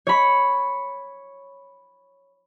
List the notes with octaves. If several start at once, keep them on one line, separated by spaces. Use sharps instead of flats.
C#5 B5